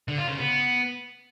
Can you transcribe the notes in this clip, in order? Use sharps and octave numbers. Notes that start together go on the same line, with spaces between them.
D3
F4
C#3
B3